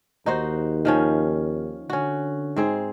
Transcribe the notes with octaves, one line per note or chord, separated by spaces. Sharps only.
D#2 D#4 F#4 C5
D#3 F3 C#4
D3 C#4 F#4
G#2 C4 G#4